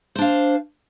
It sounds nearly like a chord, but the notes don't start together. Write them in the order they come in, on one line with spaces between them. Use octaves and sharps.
C5 D4 F5